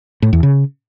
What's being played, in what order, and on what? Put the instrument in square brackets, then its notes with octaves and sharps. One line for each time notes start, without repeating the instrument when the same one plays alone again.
[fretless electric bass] A2
E2
C#3